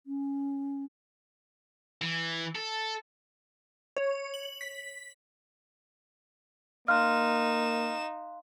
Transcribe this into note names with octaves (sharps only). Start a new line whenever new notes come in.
C#4
E3
A4
C#5
F#7
B6
A#3 D#4 F5 C6 F6 F#6 E7